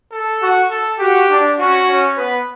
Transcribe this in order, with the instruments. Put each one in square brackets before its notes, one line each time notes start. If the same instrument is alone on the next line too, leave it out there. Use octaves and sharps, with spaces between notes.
[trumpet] A4
[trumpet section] F#4
[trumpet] A4
[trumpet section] F#4 [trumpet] G4
[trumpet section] D4
[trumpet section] C#4 [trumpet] F#4
[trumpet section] C#4
[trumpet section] B3 [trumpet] B4